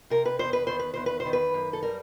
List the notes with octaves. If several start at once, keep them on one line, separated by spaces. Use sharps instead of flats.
C3 A#4
B4
E2 C5
B4
D#3 C5
B4
E2 C5
B4
C5
D#3
B4
F#2
A4
G3 A#4